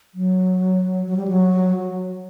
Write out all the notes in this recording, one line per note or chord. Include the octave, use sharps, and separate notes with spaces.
F#3
F#3
G3
F#3